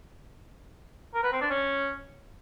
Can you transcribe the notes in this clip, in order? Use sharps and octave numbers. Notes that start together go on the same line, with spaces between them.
A#4
B4
C4
D4
C#4